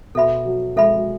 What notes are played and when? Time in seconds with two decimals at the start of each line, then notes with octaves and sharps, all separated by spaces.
0.15 B2 A4 E5 B5
0.45 F#3
0.76 G#3 A4 E5 B5
0.96 F#3